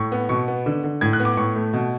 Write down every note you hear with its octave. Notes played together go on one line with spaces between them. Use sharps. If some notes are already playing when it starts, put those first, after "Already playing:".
Already playing: A2 C#6
B3
B2 C#6
B3
D3
D3
A2 G#6
F#6
B3
D6
A2 C#6
A3
B2